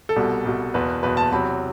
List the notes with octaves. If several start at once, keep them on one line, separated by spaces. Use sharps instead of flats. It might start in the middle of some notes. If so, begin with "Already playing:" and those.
A4
C2 B2 G3
C2 B2 G3
F#1 E2 B2 B4
F#1 E2 B2 B4
A5
E2 C3 F#3 B5